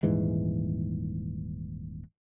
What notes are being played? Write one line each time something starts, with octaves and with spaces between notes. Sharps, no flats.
D#1 G#2 E3 G#3